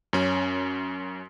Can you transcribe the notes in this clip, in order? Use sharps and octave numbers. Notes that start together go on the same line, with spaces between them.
F#2 C#4